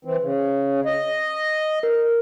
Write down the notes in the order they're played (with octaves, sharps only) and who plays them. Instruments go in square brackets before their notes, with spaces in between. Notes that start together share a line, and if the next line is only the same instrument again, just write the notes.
[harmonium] E3 C4
C#3
D#5
[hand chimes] A#4